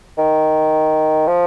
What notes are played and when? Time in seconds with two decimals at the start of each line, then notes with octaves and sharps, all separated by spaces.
0.18 D#3
1.27 F3